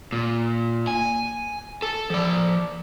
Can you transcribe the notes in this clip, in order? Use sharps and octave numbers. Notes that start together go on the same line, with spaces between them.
A#2
G#5
A4
F3 D5